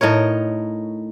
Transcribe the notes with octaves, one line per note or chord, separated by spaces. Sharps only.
A2 D#4 A#4 C#5